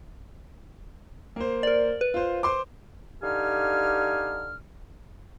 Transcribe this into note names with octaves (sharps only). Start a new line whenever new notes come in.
A#3 C5
A#4 D5
B4
F4 C5
C5 C6 D6
D3 D#4 G4 F5 G#5 F6